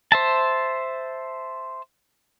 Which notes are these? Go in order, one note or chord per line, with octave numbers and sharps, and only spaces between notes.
C5 E5 A5